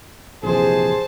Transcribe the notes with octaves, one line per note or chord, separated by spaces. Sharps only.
A#1 E2 C3 G#4 C5 A5